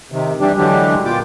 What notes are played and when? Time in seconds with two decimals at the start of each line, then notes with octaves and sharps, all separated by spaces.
0.12 C3 D#3
0.40 E3 G3 D4 G4
0.57 D3 E3 F#3 G#3 D4 G4
1.05 A#2 B3 F4 G5 D6